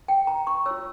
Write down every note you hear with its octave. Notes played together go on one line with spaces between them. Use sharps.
G5
A#5
C#6
F4 C#5 E6